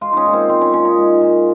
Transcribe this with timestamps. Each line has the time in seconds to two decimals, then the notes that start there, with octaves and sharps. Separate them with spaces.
0.01 G#3 F4
0.13 C#4 D#4
0.25 A#2
0.33 C4
0.49 G#3 C4
0.61 C#4
0.73 A#2 C#4
0.85 D#4
0.98 G#3
1.21 A#2